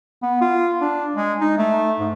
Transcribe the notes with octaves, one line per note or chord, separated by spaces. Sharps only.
B3
F4
D4
G#3
D#4
A3
G#2